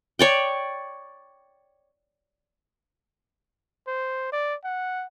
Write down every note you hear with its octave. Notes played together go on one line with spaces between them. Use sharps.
C#5 D5 G5
C5
D5
F#5